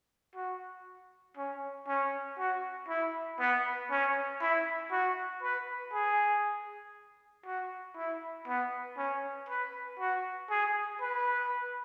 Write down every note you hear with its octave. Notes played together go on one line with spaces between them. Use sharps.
F#4
C#4
C#4
F#4
E4
B3
C#4
E4
F#4
B4
G#4
F#4
E4
B3
C#4
B4
F#4
G#4
B4